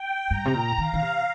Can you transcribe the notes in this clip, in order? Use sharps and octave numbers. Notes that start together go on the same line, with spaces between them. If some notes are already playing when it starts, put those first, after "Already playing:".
Already playing: G5
G2 A#5
C3
A#2
D#3 F5
D#3
C3